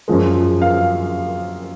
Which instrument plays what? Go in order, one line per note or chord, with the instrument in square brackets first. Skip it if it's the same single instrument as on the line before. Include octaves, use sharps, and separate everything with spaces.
[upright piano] F#2 F3 G#3
F5